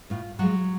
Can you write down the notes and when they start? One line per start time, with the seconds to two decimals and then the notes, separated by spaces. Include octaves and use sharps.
0.10 A2 F4
0.39 F3 F#3 G#3 F#4